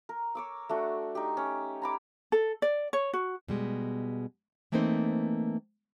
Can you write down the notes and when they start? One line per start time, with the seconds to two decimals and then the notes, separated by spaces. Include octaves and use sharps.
0.09 A#4
0.35 C#5 D6 E6
0.69 A3 D4 F#4
1.15 D#4 G4
1.37 C#4
1.82 A#5 B5 D6
2.32 A4
2.62 D5
2.93 C#5
3.13 F#4
3.48 B2 G3 G#3
4.72 E3 A3 A#3 C4 D#4 C5